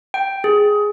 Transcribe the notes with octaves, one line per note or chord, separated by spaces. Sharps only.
G5
G#4